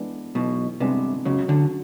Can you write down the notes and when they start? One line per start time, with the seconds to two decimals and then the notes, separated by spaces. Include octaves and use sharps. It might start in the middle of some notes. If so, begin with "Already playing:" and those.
Already playing: E3 G#3 B3 D4
0.35 B1 B2 E3
0.80 C2 C3 G#3 B3 D4
1.25 C#2 C#3 F#3
1.48 D2 D3